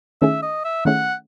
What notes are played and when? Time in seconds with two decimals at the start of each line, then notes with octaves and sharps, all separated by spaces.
0.21 D#3 A3 C#4 E4 G#4 E5
0.42 D#5
0.65 E5
0.85 D#3 A3 C#4 E4 G#4 F#5